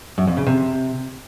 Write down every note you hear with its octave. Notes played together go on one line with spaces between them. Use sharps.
F#2
F2
C#3
C3